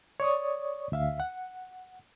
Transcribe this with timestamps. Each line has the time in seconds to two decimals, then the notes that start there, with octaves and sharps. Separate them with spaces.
0.20 C#5 D5 C#6 D#6
0.92 D2 E5 F5
1.20 F#5